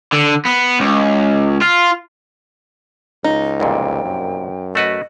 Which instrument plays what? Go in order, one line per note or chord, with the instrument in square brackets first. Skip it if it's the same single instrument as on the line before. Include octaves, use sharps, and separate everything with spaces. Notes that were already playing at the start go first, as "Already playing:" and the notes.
[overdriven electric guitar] D3
B3
C#2
F4
[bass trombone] C#2 [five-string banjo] D#4
[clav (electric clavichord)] C2 F2 A#2 [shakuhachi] G5
[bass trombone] F#2
[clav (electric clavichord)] A3 F#4 B4 [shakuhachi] D#5